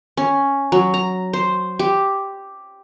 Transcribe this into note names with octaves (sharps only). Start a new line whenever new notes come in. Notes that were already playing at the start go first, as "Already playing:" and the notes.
C#4
F#3
A#5
C5
G4